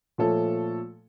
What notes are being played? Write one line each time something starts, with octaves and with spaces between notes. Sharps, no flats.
A#2 F3 A3 A4 C#5